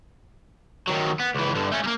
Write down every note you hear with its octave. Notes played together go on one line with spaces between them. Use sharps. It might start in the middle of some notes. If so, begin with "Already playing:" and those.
D#3 F#3
B3
C#2 E3
G2 D3
A3 C#4
G3 A#3